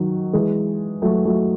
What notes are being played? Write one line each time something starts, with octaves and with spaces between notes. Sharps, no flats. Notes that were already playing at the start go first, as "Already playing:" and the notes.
Already playing: D#3 F#3
E3 G#3
F#3 A3
F#3 A3